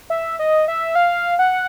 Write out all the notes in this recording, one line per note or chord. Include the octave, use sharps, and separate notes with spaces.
E5
D#5
E5
F5
F#5